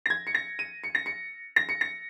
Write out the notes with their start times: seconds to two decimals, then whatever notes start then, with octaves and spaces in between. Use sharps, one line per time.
0.06 A#6
0.10 G#6
0.27 C#7
0.35 A#6
0.59 D#7
0.84 C#7
0.95 A#6
1.06 C#7
1.56 A#6
1.69 C#7
1.81 A#6